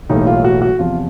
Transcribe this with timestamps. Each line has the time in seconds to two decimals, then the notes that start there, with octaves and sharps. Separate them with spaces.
0.09 B1 A2 E3 G3 A#3 D#4
0.27 F4
0.44 F#4
0.62 F#4
0.79 E2 C3 F3 F4